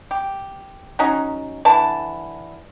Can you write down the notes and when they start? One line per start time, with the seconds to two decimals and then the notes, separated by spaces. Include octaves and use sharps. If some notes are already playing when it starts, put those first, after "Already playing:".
0.11 G4
0.99 F#3 C#4 D#4
1.65 D3 E3 A5